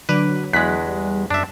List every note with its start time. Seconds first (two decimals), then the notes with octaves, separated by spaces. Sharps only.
0.09 D3 F#3 D4 B4
0.53 E2 G#3 F#6 B6
0.86 G3
1.30 F#2 D4 E5